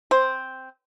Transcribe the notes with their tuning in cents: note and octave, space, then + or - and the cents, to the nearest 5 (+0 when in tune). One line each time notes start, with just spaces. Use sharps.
C4 +0 C5 +0